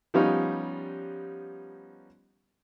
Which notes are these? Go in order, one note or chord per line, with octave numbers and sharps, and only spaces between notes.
F3 G3 B3 C#4 D#4 F4